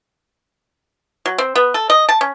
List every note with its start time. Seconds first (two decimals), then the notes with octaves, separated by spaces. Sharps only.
1.26 F#3
1.38 C4
1.55 B3
1.74 A4
1.90 D#5
2.09 A5
2.21 C#4